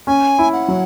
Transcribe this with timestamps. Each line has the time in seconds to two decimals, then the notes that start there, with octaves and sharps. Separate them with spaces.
0.07 C#4 G#5
0.39 E4
0.53 F#5
0.68 F#3